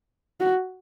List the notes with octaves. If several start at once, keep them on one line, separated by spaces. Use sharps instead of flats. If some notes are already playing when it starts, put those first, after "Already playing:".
F#4